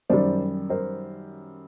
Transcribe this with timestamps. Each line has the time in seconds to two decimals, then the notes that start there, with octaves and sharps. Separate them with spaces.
0.10 F#2 D#3 G3 C5 D5
0.70 A#4 C5